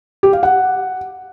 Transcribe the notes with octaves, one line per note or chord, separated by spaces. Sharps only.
G4
F5
F#5